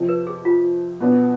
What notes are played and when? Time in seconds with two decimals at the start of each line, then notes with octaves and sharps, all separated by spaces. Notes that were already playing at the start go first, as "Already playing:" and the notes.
Already playing: F2 C3 F3
0.09 B4
0.27 G#4
0.45 F4
1.00 B1 B2 B3 D4